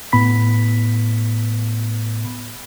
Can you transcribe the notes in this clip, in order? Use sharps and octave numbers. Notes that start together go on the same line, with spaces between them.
A2 B3 B5 B6